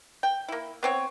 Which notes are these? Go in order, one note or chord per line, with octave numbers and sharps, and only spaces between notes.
G5
A#3 E4
B3 C4 C#5